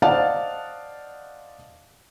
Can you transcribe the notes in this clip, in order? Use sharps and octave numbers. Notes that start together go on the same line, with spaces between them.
C5 D5 D#5 F5 F#5 A5